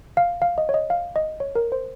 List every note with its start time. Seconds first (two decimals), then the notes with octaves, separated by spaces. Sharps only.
0.17 F5
0.42 F5
0.58 D#5
0.69 C#5
0.74 D#5
0.90 F5
1.16 D#5
1.40 C#5
1.55 A#4
1.72 C5